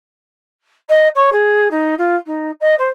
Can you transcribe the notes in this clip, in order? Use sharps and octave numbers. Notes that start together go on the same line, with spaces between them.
D#5
C#5
G#4
D#4
F4
D#4
D#5
C5